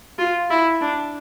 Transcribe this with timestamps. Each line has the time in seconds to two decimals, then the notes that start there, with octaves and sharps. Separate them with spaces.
0.19 F4
0.50 E4
0.81 D4